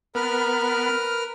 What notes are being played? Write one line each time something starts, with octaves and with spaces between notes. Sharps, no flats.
B3 A#4 B4 F6